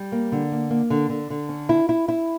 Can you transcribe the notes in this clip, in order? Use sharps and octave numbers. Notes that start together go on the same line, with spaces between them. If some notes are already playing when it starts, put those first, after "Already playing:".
Already playing: G3
A#3
D3
A#3
A#3
D3
D3
D3
C#4
E4
E4
E4